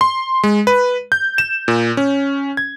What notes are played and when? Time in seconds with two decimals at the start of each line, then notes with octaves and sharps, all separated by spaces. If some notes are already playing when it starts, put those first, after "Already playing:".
0.01 C6
0.44 G#3
0.67 B4
1.12 G6
1.38 E7
1.68 A#2
1.97 C#4
2.57 G#6